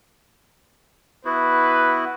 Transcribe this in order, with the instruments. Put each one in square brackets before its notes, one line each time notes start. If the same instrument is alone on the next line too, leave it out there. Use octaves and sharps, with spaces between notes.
[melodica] B3 E4 F#4 [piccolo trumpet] B4